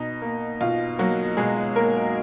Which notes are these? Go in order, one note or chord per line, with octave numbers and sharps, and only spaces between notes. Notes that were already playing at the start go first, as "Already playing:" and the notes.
Already playing: B2 D#4
A#3
B2 F4
F#3 A#3 F#4
B2 G#3 G#4
A#3 A#4